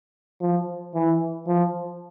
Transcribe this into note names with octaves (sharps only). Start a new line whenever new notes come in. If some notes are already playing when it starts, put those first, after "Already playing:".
F3
E3
F3